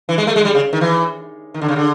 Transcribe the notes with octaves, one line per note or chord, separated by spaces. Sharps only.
E3
G#3
A3
G#3
G3
C#3
D#3
E3
D#3
D3
C#3
D3